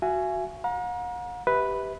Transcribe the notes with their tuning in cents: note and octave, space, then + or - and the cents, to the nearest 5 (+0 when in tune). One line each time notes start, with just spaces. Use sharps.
F#4 +0 E5 +40 G#5 +5
F#5 -45 A#5 +35
G4 +0 B4 +0 E5 -35